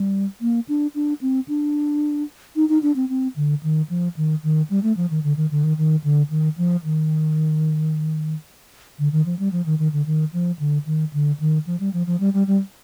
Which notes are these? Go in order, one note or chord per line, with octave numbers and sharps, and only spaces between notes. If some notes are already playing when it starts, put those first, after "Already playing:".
Already playing: G3
A#3
D4
D4
C4
D4
D#4
D#4
D4
C4
C4
D3
D#3
F3
D#3
D#3
G3
A3
F3
D#3
D3
D#3
D3
D#3
D#3
D3
D#3
F3
D#3
D3
D#3
F3
G3
F3
D#3
D#3
D3
D#3
F3
D3
D#3
D3
D#3
F3
G3
F3
F3
G3
G3
G3